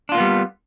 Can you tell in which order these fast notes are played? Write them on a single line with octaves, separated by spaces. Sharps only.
D4 F4 A#3 B3 G3